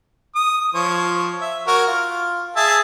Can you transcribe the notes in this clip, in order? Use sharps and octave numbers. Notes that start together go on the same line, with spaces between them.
D#6
F3 C#5
E5
F#4 A#4 C#5
F4
G#4 E5 A5